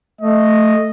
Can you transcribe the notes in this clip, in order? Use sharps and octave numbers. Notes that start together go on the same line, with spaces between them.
A3 D#5